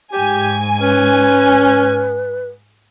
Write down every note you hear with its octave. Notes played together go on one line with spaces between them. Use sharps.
G#2 G4 G#5
C#4 B4